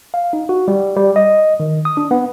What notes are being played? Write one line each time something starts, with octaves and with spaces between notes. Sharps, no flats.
F5
D#4
F#4
G3
G3
D#5
D#3
D#6
D4
B3